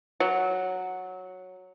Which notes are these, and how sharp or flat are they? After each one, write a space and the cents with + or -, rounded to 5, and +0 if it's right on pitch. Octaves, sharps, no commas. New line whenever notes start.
F#3 -5